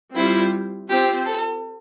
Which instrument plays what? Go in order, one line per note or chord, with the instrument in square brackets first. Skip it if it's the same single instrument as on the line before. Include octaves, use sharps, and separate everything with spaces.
[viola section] G3 C4 F4 C5 [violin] E4
[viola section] C4 F4 C5 [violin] G4
[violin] A4